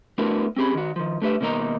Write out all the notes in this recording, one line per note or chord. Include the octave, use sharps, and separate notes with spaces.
A3 B3 D4 E4 F#4 A#4
C4 C#4 G4 G#4 B5
D#3 F#4
D#3 F3
A3 D4 G4 B4 E5
B2 D#3 A#3 D#4 A#5